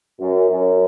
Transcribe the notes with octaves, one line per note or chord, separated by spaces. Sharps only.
F#2
F#2